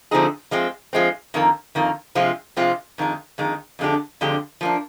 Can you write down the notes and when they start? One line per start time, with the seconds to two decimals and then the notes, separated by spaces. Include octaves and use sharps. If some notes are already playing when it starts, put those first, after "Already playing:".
0.11 D3 F3 C4 D#4 G#4
0.51 F3 G#3 C4
0.93 F3 G#3 C4
1.34 F2 D#3 A#3
1.75 F2 D#3 A#3
2.15 C3 F3 G#3 C4 F4
2.57 C3 F3 G#3 C4 F4
2.98 F2 D#3 G#3
3.38 F2 D#3 G#3
3.79 F2 D3 G#3 D4 G4
4.21 F2 D3 G#3 D4 G4
4.61 F3 A#3 D4